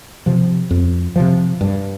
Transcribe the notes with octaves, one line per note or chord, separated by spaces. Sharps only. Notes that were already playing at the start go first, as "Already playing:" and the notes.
C3 F3
F2
C3 F3
G2